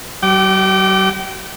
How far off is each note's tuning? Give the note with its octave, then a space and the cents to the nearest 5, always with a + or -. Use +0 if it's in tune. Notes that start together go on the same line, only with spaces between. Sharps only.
F#3 +45 G5 -35 D6 +0